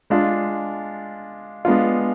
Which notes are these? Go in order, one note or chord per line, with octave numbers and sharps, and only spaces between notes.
G#3 D4 F4
G#3 B3 D4 F4